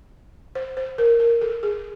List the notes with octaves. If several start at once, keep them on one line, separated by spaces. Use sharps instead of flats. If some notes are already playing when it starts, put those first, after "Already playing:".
C5
C5
A#4
A#4
A4
G#4